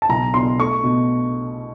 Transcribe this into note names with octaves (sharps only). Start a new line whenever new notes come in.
A5
B1 A#5
B2 C6
A3 C#6
B2